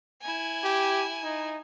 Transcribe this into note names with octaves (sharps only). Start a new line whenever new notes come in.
E4 G#5
G4
D#4